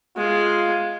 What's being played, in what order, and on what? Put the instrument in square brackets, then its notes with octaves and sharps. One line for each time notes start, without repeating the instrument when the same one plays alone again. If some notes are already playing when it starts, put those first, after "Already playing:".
[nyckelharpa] G#3 [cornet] F4